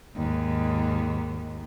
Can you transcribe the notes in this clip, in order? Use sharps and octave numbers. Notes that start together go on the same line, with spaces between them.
D#2 G#2